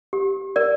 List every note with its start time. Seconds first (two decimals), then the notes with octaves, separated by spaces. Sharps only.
0.13 G4
0.56 A#4 D5